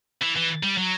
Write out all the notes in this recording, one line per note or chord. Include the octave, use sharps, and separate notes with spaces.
E3
E3
G3
F#3